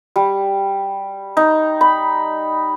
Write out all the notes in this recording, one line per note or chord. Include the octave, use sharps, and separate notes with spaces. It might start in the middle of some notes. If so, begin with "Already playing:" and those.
G3
D#4
B5